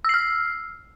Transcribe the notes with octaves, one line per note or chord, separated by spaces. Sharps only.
E6 F6 C7